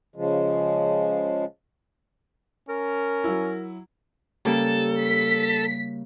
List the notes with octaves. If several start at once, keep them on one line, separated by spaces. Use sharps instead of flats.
C#3 F3 G#3
C#4 A#4
F#3 E4
C#3 G3 A#3 A4
B6